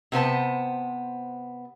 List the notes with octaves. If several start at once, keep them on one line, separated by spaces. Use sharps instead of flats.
C3 B3 C5 A5